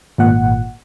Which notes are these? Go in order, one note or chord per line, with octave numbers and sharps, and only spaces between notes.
G#1 A#2 F#5